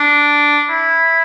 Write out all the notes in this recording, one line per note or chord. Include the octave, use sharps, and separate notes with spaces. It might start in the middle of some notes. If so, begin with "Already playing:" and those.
Already playing: D4
E4